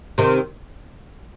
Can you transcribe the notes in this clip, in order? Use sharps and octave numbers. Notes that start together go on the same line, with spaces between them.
C3 D#3